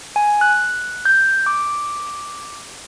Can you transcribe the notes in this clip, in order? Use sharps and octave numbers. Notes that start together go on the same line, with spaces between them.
G#5
F#6
G6
D6